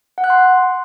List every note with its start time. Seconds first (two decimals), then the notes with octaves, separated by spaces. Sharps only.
0.18 F#5
0.24 F#6
0.30 C6